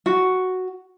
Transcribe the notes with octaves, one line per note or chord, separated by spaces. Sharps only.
F#4